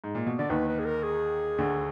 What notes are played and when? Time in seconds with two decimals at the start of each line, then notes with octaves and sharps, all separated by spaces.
0.04 G#2
0.15 A#2
0.26 B2
0.38 D3 D5
0.50 D#2 D#3 B4
0.68 B4
0.79 G#4
0.85 A#4
1.03 G#4
1.58 D2 D3